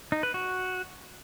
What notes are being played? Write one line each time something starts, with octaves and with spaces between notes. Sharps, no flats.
D#4
B4
F#4